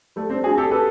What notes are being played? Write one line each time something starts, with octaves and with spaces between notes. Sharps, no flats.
G3 A3
C4 D4
F#4 G#4
G4 A4
A4 B4